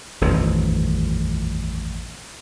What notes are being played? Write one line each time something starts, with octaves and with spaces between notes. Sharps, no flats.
D#1 A1 F2 F3